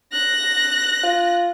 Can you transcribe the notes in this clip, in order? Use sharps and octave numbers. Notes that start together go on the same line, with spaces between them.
F#6 A#6
F4